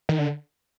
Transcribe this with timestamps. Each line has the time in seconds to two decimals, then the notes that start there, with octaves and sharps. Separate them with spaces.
0.09 D#3
0.19 D3